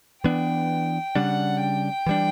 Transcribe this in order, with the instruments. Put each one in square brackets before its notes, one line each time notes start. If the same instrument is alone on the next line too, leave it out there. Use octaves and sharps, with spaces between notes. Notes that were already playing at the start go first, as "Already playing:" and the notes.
[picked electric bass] E3 B3 D4 [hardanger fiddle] G5
[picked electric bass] C#3 G3 D4 [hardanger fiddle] F#5
[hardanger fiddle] G5
[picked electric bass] E3 G3 D4